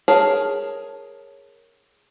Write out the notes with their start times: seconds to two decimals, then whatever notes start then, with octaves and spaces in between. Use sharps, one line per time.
0.08 G#4 A#4 C#5 A5